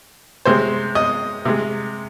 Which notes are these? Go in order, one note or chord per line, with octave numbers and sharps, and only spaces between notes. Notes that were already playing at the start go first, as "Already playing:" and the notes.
C3 G#3 C5
D#5
C3 G#3